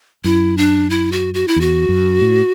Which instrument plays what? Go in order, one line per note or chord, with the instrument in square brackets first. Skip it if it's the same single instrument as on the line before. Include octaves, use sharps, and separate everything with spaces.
[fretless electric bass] F#2 [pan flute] E4
[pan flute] D4
E4
F#4
F#4
E4
[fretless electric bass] E2 [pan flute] F#4
[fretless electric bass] F#2
A2